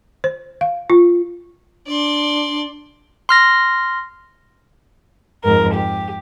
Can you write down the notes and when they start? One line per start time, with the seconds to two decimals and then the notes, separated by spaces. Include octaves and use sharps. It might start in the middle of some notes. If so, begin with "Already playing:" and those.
0.24 C5
0.61 F5
0.90 F4
1.87 D4 D5 C6
3.29 C6 F6 A#6
5.43 F2 G#2 A#4
5.72 G4